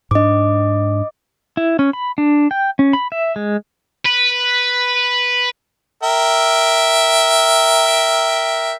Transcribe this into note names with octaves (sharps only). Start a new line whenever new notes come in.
G#2 D4 D#5 D6
E4
C#4
B5
D4
G5
C#4
B5
E5
G#3
B4
A#4 E5 G5